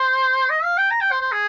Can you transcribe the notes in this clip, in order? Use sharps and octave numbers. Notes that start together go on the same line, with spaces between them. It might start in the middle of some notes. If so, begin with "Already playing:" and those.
Already playing: C5
D#5
F5
G5
A#5
G5
C5
C5
G#4